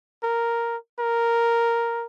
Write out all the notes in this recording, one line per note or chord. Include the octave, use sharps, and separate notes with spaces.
A#4
A#4